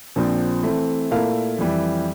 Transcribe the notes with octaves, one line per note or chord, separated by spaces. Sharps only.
A#1 A#2 F3 C4 F4
E3 A3 C4
A#2 A3 E4 A#4 F5
F2 E3 G3